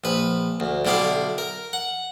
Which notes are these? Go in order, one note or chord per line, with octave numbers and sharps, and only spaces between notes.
A#1 B4
D2
B1 D3 E4 G4 F5
A#4
F#5